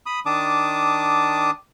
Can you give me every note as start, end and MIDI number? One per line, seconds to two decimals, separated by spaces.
0.06 0.20 83
0.06 0.20 87
0.26 1.51 51
0.26 1.51 62
0.26 1.51 81
0.26 1.51 86
0.26 1.51 87